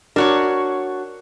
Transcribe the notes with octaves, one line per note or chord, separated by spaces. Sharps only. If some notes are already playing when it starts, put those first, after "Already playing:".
D4 F#4 A#4 C#5